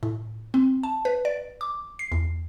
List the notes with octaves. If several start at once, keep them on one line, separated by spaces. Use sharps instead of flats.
A2
C4
A5
B4
D5
D6
C7
E2